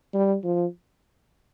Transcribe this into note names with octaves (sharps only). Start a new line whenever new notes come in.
G3
F3